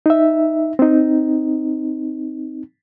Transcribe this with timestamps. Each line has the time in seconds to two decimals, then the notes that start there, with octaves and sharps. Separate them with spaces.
0.06 D#4 E5
0.79 C4 D#4